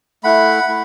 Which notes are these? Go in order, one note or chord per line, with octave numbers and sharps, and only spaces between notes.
A3 E4 F#5 B5
A3 E4